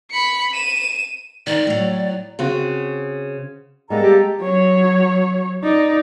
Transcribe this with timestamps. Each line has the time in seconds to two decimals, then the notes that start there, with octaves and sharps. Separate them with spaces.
0.11 B5 C#7
0.53 D#7 E7
1.47 D#3 D5
1.67 A2 F#3
2.39 C#3 C4 F#4
3.90 G3 G#3 A#3 B3 A4 A#5
4.03 G4
4.40 F#3 C#5
5.63 D#4 D5